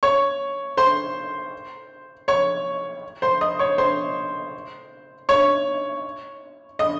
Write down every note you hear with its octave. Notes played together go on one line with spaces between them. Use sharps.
C#5 C#6
C5 C6
C#5 C#6
C5 C6
D#5 D#6
C#5 C#6
C5 C6
C#5 C#6
D#5 D#6